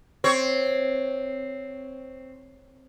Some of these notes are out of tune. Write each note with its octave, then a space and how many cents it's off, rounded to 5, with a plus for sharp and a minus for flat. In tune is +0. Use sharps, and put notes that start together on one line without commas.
C4 +0 C#5 +0